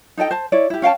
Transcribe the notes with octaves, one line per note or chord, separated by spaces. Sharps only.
D#4 A4 D#5 G5
C5 A5
E4 C#5 D5
E4 G4
C#4 F5 G5 A5